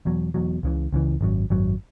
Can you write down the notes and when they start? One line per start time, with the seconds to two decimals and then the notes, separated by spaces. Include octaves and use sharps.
0.05 E1 E2 B2 F#3
0.34 E1 E2 B2 F#3
0.63 C#2 C#3 E3
0.93 C#2 C#3 E3
1.21 G#1 F#2 F#3
1.50 G#1 F#2 F#3